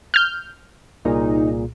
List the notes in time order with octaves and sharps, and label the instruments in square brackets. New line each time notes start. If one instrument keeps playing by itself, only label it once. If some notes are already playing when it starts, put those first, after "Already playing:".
[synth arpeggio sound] F6 G6
[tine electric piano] C2 A#2 G#4 [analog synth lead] D#4